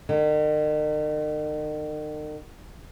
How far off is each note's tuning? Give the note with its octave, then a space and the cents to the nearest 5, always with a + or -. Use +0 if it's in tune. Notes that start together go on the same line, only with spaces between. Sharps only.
D#3 -40